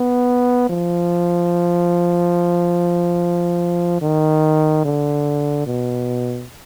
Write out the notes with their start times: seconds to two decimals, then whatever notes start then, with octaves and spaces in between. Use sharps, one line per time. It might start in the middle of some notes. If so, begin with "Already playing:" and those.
Already playing: B3
0.69 F3
4.01 D#3
4.85 D3
5.66 B2